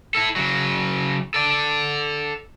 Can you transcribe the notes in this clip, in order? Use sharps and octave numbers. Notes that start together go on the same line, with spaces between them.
E4 A4
C#3 F#3
A4 D5